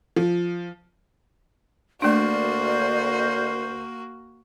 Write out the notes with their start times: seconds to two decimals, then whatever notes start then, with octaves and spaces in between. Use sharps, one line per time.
0.16 F3
2.02 D2 A3 A#3 D4 F#4 A#4 C5 D5